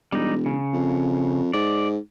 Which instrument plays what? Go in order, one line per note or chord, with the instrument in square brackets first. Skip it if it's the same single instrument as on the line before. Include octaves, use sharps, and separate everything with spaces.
[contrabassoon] E1 [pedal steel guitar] G3 D#4
[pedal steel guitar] C#3
[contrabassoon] F2
[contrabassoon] G#2 [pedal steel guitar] D5